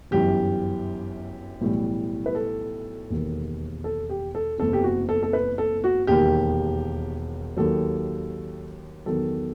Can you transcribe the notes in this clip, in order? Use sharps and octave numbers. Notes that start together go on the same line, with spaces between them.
G1 F#2 E3 G4
B1 A2 E3 G3
B4
A4
E1 D#2 D#3
A4
G4
A4
F#1 E2 C3 A4
G4
F#4
A4
A4
B4
A4
F#4
E1 D#2 D#3 G4
D#2 D#3 F#3 A4
E2 D#3 F#3 A4